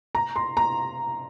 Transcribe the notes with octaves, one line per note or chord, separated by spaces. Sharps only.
A#5
C6
A#5